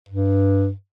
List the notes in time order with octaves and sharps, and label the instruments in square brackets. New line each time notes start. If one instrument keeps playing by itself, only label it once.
[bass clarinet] G2